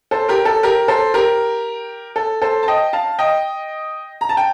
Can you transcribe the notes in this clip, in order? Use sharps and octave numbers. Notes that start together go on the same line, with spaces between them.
A4 C5
G4 A#4
A4
G4 A#4
A4 C5
G4 A#4
A4
A4 C5
A5
D#5 G5
F5 A5
D#5 G5
A#5
A5
G5